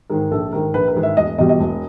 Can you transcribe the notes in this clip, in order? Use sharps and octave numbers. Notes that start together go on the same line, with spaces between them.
G#2 D#3 G#3 A#4
A#1 A4
G#2 D#3 G#3 A#4
A#1 B4
A#4
G#2 D#3 G#3
E5
E1 D#5
E2 B2 G3 D#5
D#5
E1